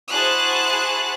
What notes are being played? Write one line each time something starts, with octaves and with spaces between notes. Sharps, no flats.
E4 F#4 G#4 C5 A5 F#6